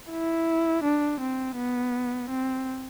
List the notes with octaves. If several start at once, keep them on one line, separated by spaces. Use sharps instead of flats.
E4
D4
C4
B3
C4